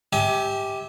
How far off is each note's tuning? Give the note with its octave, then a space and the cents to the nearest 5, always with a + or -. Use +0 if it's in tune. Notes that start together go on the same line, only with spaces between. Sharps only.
G4 +0 E5 -35 G#5 +25